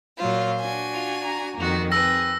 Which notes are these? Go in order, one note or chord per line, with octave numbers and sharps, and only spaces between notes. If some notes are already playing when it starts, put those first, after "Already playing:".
A#2 F#3 F4 C5
D4 F#4 G#5
F4
A#5
F2 D#3 A#3 F#4
C4 G#4 B4 E6 A#6